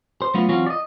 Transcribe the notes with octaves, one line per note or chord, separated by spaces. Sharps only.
C5
F#3 A3 B3 C#4 F4
E3 F#3 C4 C#4 F4 F#4
D5 D#5